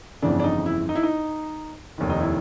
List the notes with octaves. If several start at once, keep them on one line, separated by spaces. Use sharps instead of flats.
G1 F2 C#3 E3 D4
D4
D#4
E4
D#4
E4
D#4
F1 D#2 D#3
D#4
E4